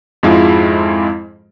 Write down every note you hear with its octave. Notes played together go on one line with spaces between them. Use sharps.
F2 G#2 G#3 E4 F4